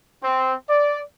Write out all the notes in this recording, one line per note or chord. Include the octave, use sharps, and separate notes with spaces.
C4
D5